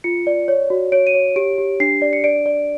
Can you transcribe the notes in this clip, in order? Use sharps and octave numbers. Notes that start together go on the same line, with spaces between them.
F4 C#7
D5
C#5
F#4
C#5 D7
D#7
C#5
G4 D7
G4
D4 C7
D5
C#7
D5 D7
D5